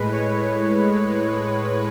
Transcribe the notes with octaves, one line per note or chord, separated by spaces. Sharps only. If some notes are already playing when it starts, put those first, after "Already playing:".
Already playing: A2 G#3 B4
C#5